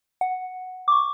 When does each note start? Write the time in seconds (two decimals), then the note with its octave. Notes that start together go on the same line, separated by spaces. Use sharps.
0.21 F#5
0.88 C#6 D6